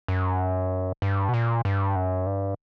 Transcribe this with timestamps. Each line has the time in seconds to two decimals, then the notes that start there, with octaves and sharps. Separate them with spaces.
0.08 F#2
1.02 G2
1.29 B2
1.34 A#2
1.65 G2
1.96 F#2
2.26 G2